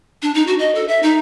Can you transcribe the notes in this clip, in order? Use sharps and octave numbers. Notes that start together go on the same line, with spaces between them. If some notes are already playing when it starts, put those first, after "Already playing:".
D4
D#4
F#4
D#5
A4
E5
D#4